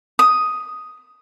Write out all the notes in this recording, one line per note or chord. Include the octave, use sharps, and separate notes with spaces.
D#6